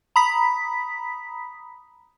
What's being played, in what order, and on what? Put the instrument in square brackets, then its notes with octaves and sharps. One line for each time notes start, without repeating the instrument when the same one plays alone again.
[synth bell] A#5 B5 D#6 B6